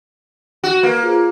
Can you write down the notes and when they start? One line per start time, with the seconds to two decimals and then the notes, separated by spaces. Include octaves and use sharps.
0.64 F#4
0.83 A#3 A#4 B4
1.03 F4 G#4 C5